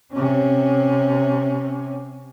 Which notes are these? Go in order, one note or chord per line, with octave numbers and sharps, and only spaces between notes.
C3 C#4